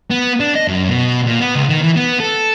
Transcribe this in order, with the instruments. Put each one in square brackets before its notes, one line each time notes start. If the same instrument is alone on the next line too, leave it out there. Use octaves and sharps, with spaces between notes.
[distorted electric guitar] B3
D4
D#5
F#2
B2
A#2
B3
C#2
D#3
E3
B3
A4